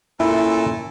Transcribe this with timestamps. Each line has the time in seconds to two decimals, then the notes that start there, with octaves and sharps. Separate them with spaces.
0.20 A#2 C#4 E4 A4